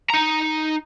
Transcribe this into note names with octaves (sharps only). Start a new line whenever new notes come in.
D#4 A#5